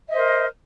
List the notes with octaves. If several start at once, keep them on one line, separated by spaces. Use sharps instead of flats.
A#4 C5 D#5 E5